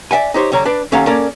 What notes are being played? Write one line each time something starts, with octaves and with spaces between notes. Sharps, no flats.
D5 E5 F#5 G#5
D#4 G4 C5 C#5
D3 G3 C#5 A5 A#5
D4 B4 D5
D#2 C#4 A4 F5 F#5 A#5
A#3 C#4 A4 A#4 D5